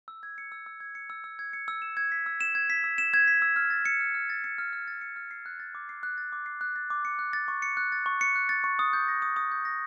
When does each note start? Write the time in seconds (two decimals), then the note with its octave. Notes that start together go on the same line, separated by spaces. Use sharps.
0.08 E6
0.23 G#6
0.38 C#7
0.52 E6
0.66 E6
0.80 G#6
0.95 C#7
1.10 E6
1.24 E6
1.39 G#6
1.53 C#7
1.68 E6
1.82 E7
1.97 G#6
2.12 B6
2.26 E6
2.41 E7
2.55 G#6
2.70 B6
2.84 E6
2.98 E7
3.14 G#6
3.28 B6
3.42 E6
3.56 F6
3.70 A6
3.85 C#7
4.00 F6
4.15 F6
4.30 A6
4.44 C#7
4.58 F6
4.73 F6
4.88 A6
5.01 C#7
5.16 F6
5.31 C7
5.46 F#6
5.60 A6
5.75 D6
5.89 C7
6.03 F#6
6.18 A6
6.32 D6
6.46 C7
6.61 F#6
6.76 A6
6.90 D6
7.05 C#7
7.19 F#6
7.33 A6
7.48 C#6
7.62 C#7
7.77 F#6
7.92 A6
8.06 C#6
8.21 C#7
8.35 F#6
8.49 A6
8.64 C#6
8.79 D#6
8.93 G6
9.08 A#6
9.22 D#6
9.36 D#6
9.52 G6
9.65 A#6